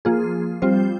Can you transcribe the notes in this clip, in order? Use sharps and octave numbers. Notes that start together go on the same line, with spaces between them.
F3 A#3 F4 G#4
G3 C4 F4 C5